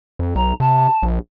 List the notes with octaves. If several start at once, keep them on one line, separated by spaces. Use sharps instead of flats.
F2
B1 A#5
C3 A5
A#1